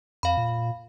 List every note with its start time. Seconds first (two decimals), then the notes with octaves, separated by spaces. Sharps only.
0.23 F2 F5 B5
0.37 A#2